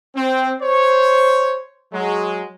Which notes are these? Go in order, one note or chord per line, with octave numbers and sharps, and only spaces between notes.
C4
C5 C#5
F#3 G#3